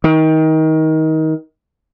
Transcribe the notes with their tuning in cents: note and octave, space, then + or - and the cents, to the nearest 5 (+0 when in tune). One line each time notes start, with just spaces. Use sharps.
D#3 +25